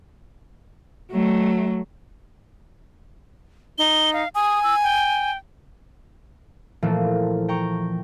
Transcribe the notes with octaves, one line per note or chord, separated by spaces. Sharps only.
F#3 A3
D#4 G7
F5
G#5 D#6
E6
G5
A#2 E3 F3 A3 A#3
G5 A#5 C#6